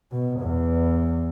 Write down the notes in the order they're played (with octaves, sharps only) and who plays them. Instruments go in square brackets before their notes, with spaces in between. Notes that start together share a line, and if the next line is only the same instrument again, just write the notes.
[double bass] B2
E2